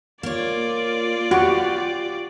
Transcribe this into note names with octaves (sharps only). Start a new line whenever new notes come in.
A#3 F4 C#5 D5
F#4 G4